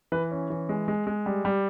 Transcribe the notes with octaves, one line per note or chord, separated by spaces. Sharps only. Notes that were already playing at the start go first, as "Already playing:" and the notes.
E3 B4
C#4
E3
G#3
G#3
G#3
G3
G3